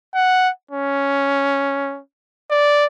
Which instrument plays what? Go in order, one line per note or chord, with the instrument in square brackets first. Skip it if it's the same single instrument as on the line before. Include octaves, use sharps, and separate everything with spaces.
[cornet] F#5
C#4
D5